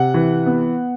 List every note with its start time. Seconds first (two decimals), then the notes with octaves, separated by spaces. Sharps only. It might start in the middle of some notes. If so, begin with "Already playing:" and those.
Already playing: C3 F#5
0.14 E3
0.46 B3